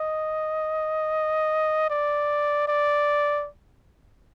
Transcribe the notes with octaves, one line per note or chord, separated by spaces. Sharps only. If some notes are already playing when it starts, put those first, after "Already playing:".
Already playing: D#5
D5
D5